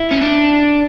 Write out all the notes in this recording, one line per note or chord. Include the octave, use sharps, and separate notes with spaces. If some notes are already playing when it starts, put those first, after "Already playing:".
Already playing: E4
C#4
D4